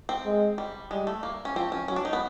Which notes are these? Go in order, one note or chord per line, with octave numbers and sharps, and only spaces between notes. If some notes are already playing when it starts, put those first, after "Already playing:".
C4
G#3
G3
G3 G#3
A3
A#3
C#4
F3 C4
C#4
F#3 C#4
D4
D#4
B3